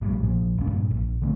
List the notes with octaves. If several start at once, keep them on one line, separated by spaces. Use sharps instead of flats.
A#1 A2 C3 G3
A#1 A#2 F3
F1 D2 G#2 C#4
G2 A#2
A#1
D3 A3 C4